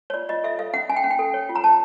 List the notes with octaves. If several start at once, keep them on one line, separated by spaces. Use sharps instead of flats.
C#5
F4 D5
F4 D#5
A4 E5
A4 F5
C#4 F#5
C#4 G#5
G5
C#4 F#5
G5
A4
C#5
F4
A#5
C#5 A5